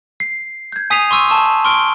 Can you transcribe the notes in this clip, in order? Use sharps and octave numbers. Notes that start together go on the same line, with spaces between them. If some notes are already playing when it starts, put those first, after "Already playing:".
C7
G6 G#6
G#5 D#6 B6 C7 D#7 F7
C6 C#6 E6 D#7
A5 C#6 E6
C6 C#6 F6 D7 G7